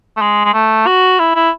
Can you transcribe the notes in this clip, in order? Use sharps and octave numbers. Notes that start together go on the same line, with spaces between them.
A3
G#3
G#3
A3
F#4
E4
E4